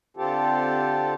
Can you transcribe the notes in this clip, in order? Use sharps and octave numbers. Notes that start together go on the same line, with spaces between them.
D3 C4 F4 G4 A4